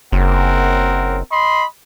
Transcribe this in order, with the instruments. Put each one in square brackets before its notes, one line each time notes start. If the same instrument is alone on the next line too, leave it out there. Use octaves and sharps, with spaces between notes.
[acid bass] F#1 [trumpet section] C4 A#4 F#5
[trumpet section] D#5 B5 C6